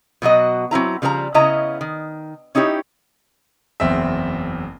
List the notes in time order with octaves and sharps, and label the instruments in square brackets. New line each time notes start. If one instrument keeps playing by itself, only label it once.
[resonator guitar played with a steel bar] B2 F#3 F#4 D#5
F#3 C4 E4 A#5
C#3 F3 G3 A4 A#5
C#3 B3 C#4 E4 D#5 A#5
D#3
C#4 D#4 E4 G4 C#5
[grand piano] F#1 E2 C4 E5